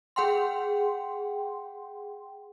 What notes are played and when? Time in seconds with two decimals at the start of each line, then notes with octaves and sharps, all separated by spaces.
0.16 G#4 F#5 G5 C6